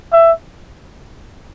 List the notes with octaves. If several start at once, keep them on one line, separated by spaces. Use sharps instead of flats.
E5